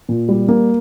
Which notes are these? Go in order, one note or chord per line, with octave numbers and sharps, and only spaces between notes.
A#2
G3
A#3